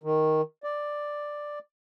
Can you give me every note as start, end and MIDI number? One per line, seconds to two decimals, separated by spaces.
0.04 0.41 51
0.64 1.59 74